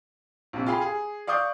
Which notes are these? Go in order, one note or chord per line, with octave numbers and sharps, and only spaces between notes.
A#1 C3
F4 G4 G#4 F5 B5
G#4
D5 F5 C#6 D#6 G6